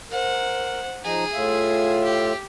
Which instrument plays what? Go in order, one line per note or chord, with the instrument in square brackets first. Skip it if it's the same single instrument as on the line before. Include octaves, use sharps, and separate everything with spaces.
[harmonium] A#4 [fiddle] C5 F#5
[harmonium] F3 D#4 A#5 [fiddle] G#4
[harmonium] A2 F4 E5
[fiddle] G4